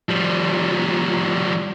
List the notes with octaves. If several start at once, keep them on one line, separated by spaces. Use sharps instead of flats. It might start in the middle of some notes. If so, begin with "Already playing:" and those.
F3 G3